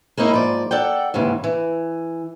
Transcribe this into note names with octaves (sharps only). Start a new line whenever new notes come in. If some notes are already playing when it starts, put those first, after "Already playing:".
G#3 A#3 C#4 D#4 E4
G#2 F3 D5
A4 D5 F#5 G5
D#2 G#2 C#3 E3
E3